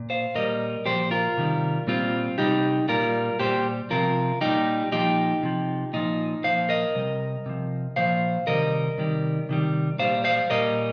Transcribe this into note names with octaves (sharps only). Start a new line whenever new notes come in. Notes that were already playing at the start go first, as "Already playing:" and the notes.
Already playing: A#2
C5 F5
A#2 G3 A#4 D#5
A#2 F3 G4 C5
F4 A#4
C3 D#3 G3
A#2 G3 C4 F4
C3 G3 D#4 G4
A#2 G3 F4 A#4
A#2 G3 G4 C5
C3 F3 F4 A#4
A#2 G3 D#4 G4
A#2 F3 D#4 G4
C3 F3
A#2 F3 D#4
A#2 F3 C5 F5
A#4 D#5
C3 G3
C3 F3
A#2 F3 C5 F5
C3 D#3 G3 A#4 D#5
C3 D#3 G3
C3 D#3 G3
A#2 G3 C5 F5
C5 F5
A#2 G3 A#4 D#5